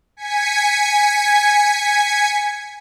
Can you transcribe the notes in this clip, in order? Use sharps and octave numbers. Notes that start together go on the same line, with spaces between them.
G#5 G#6 B6 C#7